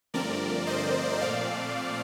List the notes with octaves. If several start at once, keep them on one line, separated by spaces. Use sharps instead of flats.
G2 D3 F3 A3 C4 A#4 D5
C5 D#5
A#2 F3 A3 C4 D5 F5